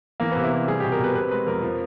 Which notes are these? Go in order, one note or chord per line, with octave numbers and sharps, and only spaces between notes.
E3 A#3
C3 B3
E4
C3
G3 G#4
B2 G4
A#4
B2 B4
C3 B4
G#3 B4
F2 A#4
F3